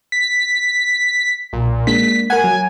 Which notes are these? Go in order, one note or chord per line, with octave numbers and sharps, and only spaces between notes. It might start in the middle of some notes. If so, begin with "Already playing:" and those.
B6
B1 A#2
G#3 A#3 D4 B6
A#4 F#5 G#5
F#3